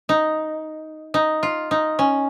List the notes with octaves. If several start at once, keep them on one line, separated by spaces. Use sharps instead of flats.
D#4
D#4
F4
D#4
C#4